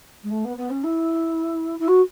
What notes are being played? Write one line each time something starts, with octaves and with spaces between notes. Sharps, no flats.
G#3
A3
B3
B3
C#4
E4
E4
F#4